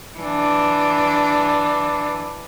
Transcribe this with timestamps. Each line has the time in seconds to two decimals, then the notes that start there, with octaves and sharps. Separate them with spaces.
0.18 E3 D4